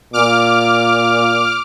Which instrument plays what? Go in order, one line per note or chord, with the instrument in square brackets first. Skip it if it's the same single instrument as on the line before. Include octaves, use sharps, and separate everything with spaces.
[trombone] A#2 [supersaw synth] D6 F6